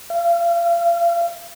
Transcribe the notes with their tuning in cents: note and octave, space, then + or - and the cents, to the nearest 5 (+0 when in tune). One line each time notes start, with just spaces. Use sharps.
F5 -35